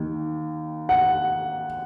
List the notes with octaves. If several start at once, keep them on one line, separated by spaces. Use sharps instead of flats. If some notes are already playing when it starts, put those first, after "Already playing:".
Already playing: D#2 D#3
F#5